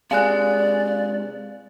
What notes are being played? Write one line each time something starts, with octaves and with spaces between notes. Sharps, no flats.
C3 G#3 D5 F5 G#5 F#6